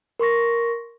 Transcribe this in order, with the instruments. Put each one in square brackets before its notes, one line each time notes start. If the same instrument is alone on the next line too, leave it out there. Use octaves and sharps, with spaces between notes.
[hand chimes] A#4 C6 C#6 A#6